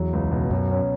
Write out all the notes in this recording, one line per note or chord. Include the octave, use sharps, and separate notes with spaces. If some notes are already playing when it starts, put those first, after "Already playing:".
Already playing: E2 F#3
C#2
B2
F#2 F#3
C#4